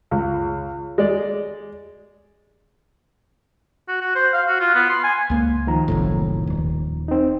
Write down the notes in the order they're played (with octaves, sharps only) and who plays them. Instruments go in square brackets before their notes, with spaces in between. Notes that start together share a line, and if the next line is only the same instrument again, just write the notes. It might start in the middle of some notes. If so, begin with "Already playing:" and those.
[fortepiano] C#2
G#3 D5
[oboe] F#4
F#4
C5
F5
F#4
F4
B3
C6
G#5
[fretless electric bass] C#2 A#3
[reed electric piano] D#3 F3 A#5
[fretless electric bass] F#1 C2 A2
D#1
[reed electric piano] C4 D#4